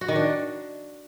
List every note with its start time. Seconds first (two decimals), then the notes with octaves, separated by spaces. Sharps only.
0.01 F#4
0.08 D#3
0.16 D4